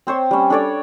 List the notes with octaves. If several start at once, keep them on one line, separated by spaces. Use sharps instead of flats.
C4 C5 C#5 C6
G3 C#4
D4 A4 C#5 D5